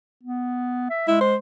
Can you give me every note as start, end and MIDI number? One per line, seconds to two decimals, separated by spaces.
0.23 0.86 59
0.90 1.06 76
1.08 1.36 56
1.08 1.20 64
1.21 1.36 72